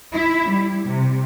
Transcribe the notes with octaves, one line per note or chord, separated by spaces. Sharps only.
E4
G3
C3